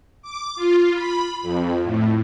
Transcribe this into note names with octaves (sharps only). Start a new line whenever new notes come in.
D6
F4
B5
F2
A2